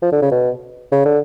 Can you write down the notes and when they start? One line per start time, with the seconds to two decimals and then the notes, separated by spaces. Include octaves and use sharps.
0.02 F3
0.12 D3
0.22 C#3
0.31 B2
0.92 C#3
1.05 D3